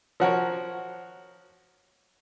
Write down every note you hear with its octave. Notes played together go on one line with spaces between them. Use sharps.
F3 F#4 A#4 C#5